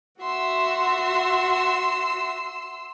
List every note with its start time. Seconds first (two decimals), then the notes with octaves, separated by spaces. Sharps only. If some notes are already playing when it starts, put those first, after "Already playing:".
0.22 F#4 E5 F#5 C6 E6